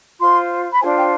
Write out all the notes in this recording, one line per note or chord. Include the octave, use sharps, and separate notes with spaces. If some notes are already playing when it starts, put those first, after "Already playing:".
F4 C5 C6
B5
D4 F4 C5 G#5
G5